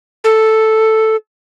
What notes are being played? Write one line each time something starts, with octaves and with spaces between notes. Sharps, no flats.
A4